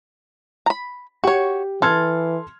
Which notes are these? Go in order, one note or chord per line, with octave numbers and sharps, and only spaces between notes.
A#5 B5
F#4 G4 C#5
E3 A4 C6 F6 G#6